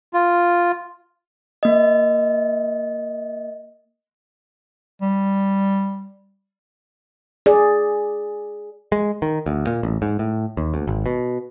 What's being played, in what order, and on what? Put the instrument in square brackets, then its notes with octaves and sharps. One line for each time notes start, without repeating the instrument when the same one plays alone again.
[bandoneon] F4
[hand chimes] A#3 D#5
[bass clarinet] G3
[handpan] G#4 D5
[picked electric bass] G#3
D#3
D2
A#2
A1
G#2
A2
D#2
D2
G#1
B2